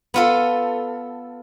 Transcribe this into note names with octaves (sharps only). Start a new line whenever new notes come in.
B3 F4 A4